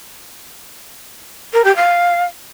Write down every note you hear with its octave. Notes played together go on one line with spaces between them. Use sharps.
A#4
G4
F5